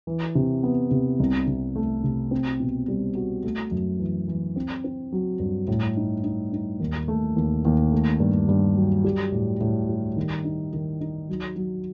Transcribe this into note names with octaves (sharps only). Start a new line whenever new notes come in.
E3
C3
B3
C3
C2
C3
A3
C3
C4
B2
G3
F#4
A3
F#2
E3
E3
C4
C4
F#3
G2
A2
D#4
D#4
D#4
D#2
A3
D#2
D#2
A3
G2
G2
F#3
G3
A2
A2
G3
D#3
D#4
D#3
D#4
F#3
F#3